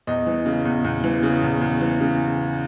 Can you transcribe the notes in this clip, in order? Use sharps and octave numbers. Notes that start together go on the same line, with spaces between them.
E2 D#5
E3
C#3
E2
E2
E3
C#3
E2
E2
E3
C#3